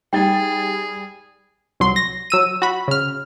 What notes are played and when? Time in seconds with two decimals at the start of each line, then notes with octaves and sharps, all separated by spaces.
0.13 G3 D#4 G#4 G5 A6
1.80 C2 F#3 C6
1.96 A#6
2.30 F#3 E6 D#7
2.62 F#4 B5
2.88 C#3 F6